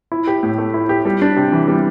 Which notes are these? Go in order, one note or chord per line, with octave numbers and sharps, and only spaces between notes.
E4
G4
A2
A3
E4
G4
G3
D4
C3
E3
G3